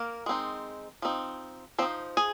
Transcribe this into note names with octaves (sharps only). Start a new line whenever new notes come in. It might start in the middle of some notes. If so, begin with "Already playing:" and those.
Already playing: A#3 A#4
G#3 C4 D#4
F3 C4 D#4
F3 C4 D#4 C5
G#4 G#5